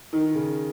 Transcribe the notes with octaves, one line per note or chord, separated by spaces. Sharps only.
D#3
C#3